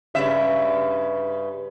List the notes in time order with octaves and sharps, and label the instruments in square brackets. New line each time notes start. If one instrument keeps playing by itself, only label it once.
[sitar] G2 C#3 E5